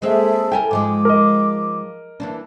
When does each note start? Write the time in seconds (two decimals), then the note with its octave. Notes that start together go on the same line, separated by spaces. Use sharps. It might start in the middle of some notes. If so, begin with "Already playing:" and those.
0.02 G#3 A#3 C4 G#4 A4 E5
0.52 E4 A4 A#4 G5 G#5
0.71 G#2 F3 G#3 D6
1.05 A#4 D#5
2.20 E3 A#3 D4